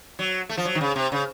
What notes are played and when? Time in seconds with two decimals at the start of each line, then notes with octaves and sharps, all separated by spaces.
0.19 F#3
0.49 A3
0.57 F3
0.65 F#3
0.75 D#3
0.81 C#3
0.96 C3
1.12 C#3